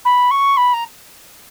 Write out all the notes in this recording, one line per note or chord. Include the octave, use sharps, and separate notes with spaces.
B5
C#6
B5
A#5